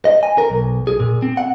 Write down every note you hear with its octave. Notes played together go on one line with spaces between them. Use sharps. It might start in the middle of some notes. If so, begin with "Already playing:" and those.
D#5
G#5
A#4
B1
G#4
A#2
C4
F#5